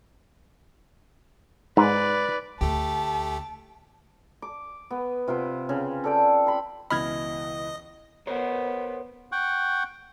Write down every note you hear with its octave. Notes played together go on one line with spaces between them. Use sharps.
G#2 B4 D5
D2 A3 G4 A5
D6
B3
C3 F4 B4 G5
C#3
A4 D5 G5
B5 C6
C#2 B2 E3 D#5 B5 F6 G#6
B3 A#4 C5 C#5
F#5 G5 C#6